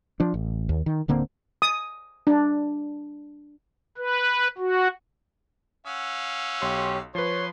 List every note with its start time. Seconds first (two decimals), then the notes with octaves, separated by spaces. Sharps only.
0.20 F3 D4
0.34 A1
0.69 D#2
0.86 D#3
1.08 D1 D3 A#3 C4
1.62 D#6
2.27 D4
3.98 B4
4.58 F#4
5.87 C#4 F5 F#5 E6
6.62 B1 G4 C#5 C6
7.15 F3 B4 C#5 C6